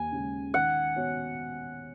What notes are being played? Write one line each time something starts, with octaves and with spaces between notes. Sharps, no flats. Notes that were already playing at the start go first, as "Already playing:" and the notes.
Already playing: D#2 G#5
C#3 G#3
D#3 F#5
B3 F#4 C#5